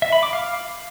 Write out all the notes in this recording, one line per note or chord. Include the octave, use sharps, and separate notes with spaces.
E5
B5
D6
F5